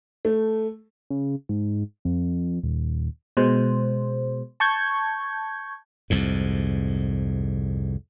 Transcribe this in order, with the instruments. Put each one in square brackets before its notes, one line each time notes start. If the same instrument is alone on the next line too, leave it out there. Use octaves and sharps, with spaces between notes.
[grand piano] A3
[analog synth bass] C#3
G#2
F2
D#1
[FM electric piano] B2 G#3 C5
A5 C#6 G6 G#6
[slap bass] C2 F2 G#2